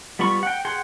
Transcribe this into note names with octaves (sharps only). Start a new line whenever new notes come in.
G3 B3 F4 B5 C#6
F#5 G5
G#4 F#5 G5 C6